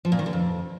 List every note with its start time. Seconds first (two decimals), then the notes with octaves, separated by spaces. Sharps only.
0.05 F3
0.12 A#2
0.19 D#3
0.26 D3
0.33 F2